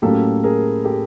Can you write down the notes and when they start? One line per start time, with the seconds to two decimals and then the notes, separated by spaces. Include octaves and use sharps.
0.02 A2 F#3 A#3 C#4 G4 A4
0.44 G#4 A#4
0.84 G4 A4